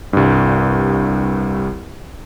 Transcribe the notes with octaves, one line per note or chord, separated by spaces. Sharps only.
C2 G2